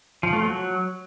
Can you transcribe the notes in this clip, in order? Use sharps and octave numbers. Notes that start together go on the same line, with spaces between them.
F3
A3
F#3